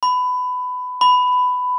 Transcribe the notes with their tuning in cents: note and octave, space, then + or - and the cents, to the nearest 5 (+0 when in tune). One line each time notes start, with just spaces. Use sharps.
B5 +20
B5 +15